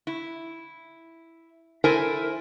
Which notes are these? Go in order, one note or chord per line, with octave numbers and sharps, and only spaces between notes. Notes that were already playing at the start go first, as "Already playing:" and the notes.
E4
E4 A4 A#4 C5 E5 G#5